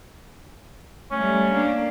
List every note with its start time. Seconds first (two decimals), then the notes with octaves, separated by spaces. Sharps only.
1.11 G3 A3 C#4
1.52 A#3 D4